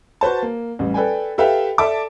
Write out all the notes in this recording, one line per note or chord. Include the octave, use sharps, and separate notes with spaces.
F#4 B4 C5 A5
A#3
A1 G3
A4 B4 D5 G5 G#5
G4 A4 B4 E5 F5 G5
A4 D5 E5 A5 D6